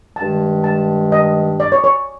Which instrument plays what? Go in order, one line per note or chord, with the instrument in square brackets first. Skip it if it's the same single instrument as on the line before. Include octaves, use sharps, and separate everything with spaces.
[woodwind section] G2 D#3 G#3 [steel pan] A5
[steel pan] A5
D#5
D5
C#5
C#5